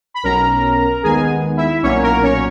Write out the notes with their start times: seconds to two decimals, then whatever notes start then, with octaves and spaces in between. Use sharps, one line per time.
0.14 B5
0.23 B1 B2 F#3 C#4 A#4 A#5
1.03 D#2 D#3 G#3 B3 G#4 G#5
1.57 E4 E5
1.82 B1 A#2 F#3 A#3 C#4 C#5
2.03 A#4
2.23 C#4 C#5